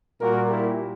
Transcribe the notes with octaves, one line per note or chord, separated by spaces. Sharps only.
A#2 G3 A#3 F#4 A#4
E4 G4